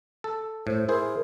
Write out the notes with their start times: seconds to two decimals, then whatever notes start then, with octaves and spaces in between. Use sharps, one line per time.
0.24 A4
0.67 A2 C5
0.88 E4 G#4 A#4 C5